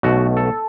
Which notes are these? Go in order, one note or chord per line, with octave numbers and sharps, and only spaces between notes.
B1 B2 A3 F#4
A4